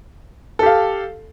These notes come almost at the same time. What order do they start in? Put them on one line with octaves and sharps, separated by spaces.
A4 G4 F5